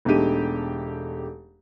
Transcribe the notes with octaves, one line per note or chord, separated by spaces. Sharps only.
E1 A3 D4 D#4 G4 D#7